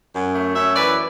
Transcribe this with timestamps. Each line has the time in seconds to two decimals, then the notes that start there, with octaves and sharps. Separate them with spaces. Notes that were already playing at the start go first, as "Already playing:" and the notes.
0.14 F#2
0.35 A3
0.55 F#2 C#5 E5
0.76 E3 B4 D5